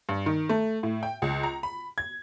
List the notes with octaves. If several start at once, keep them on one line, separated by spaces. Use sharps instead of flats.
G2
D#3
A3
A2
G5
C#2
A#5
B5
G#6